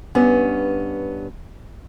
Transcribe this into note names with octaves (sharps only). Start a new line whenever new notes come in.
G2 B3 C#4